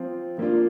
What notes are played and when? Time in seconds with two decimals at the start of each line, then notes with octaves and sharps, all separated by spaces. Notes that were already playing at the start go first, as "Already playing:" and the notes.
Already playing: F3 C4 F4
0.38 F3 A#3 D4 F4